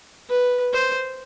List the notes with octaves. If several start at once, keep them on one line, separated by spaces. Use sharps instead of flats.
B4
C5